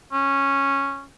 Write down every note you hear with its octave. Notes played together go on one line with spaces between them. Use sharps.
C#4